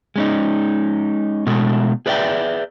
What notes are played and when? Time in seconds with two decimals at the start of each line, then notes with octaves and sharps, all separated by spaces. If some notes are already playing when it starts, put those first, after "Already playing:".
0.16 G#3 C#4 D#4
1.46 B2 G#3 A3
2.06 G#4 B4 D5 E5 G5